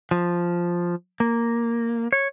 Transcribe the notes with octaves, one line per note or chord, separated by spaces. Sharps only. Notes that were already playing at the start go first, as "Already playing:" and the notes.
F3
A#3
C#5